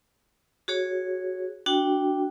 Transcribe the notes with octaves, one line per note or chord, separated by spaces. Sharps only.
F#4 G#4 C#5
D4 F#4 G5